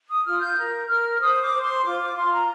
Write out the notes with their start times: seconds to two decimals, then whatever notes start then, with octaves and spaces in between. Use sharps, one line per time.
0.09 D#6
0.25 F4 F6
0.40 G6
0.56 A#4
0.88 A#4 F6
1.20 C5 D#6
1.42 D6
1.52 C5
1.62 C6
1.84 F4 D6
2.00 D6
2.16 F4 C6
2.32 A#5